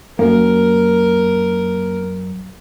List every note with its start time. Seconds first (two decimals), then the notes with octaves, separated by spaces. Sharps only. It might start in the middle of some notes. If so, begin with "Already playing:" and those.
0.19 F#2 A#3 A#4